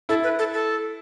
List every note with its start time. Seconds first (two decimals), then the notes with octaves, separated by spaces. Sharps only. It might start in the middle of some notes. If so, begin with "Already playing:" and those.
0.09 E4 A4
0.24 B4
0.39 A4
0.54 A4